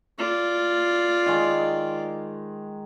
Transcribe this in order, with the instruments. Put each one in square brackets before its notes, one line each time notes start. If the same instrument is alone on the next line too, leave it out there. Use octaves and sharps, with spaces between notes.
[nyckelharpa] F4 D5
[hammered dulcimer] D#3 G#3